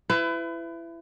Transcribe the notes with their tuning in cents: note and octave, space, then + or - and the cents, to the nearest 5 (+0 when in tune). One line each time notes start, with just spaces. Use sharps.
E4 +25 B4 +35